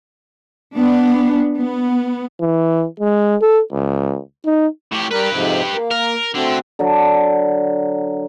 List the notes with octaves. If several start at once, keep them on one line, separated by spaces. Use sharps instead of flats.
B3 D4
B3
E3
G#3
A4
C#2
D#4
A2 G4
G3 G4 A#4 B4
F2 G#2 C3
A#3
A#4
D3 A3 C4 F#4
D3 F#3